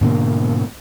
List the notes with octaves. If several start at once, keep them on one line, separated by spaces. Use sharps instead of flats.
G#2 B2 D3 A#3